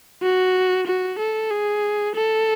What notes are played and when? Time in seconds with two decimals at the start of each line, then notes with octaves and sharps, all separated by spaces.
0.23 F#4
0.87 F#4
1.19 A4
1.51 G#4
2.15 A4